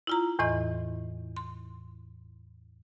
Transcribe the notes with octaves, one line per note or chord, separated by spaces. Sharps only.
E4 F4 A#5
E2 A2 E3 D#5 C6
C6